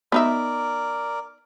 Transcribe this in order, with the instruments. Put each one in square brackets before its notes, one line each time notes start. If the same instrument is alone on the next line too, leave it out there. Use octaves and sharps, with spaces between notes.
[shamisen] B3 D#4 E5 [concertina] A#4 D5